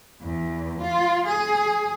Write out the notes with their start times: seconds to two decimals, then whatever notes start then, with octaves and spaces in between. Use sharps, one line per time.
0.21 E2
0.81 F4
1.27 G#4